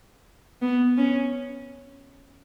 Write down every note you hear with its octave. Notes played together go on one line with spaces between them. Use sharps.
B3
C#4